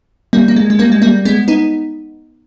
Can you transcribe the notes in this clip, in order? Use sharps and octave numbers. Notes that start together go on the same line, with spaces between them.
G3 A#3
A#3
G#3
G#3
G3 A#3
G#3
G3 A#3
G#3 B3
B3 D#4